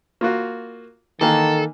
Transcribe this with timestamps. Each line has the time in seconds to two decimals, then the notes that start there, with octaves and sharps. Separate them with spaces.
0.21 A#3 F4 F#4
1.21 D#3 E3 A#3 A4